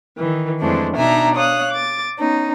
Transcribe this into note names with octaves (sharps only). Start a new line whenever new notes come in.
D#3 E3
F2 E3 G#3 A3 C4 D4
B2 D4 D#4 E5 G#5 A#5
C#5 F5 D#6 F#6
D6 A6
B3 C#4 D#4